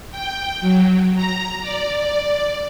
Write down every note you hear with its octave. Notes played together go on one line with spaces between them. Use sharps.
G5
F#3
A#5
D5